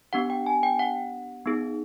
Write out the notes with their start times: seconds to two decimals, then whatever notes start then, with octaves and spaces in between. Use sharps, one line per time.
0.13 B3 D4 G4 F#5
0.30 G5
0.46 G#5
0.63 G5
0.79 F#5
1.46 B3 D#4 G#4